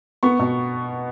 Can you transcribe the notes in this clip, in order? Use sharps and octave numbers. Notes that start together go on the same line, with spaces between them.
B3 C#6
B2